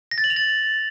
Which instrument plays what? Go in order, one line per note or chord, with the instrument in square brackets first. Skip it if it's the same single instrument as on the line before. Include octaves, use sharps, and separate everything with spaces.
[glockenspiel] A#6
A6
F#7
F7
A6